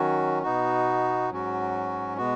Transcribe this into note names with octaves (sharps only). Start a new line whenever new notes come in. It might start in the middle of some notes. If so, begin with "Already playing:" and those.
Already playing: D#3 F#3 C#4 F#4
B2 B3 D#4 F#4
G#2 F#3 C#4 F#4
B2 G#3 B3 F#4